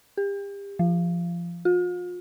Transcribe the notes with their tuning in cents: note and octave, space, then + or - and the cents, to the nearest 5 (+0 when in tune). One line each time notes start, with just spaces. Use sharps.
G4 +35
F3 -20
F4 +40